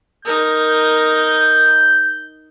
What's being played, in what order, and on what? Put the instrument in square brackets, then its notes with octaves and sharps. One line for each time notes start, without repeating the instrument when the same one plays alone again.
[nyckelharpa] D#4 A#4 [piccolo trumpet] G6